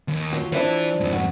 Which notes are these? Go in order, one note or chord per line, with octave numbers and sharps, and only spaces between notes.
D#2
F#3 F4
E3 F3 D4 E5
F2 G#2
F#4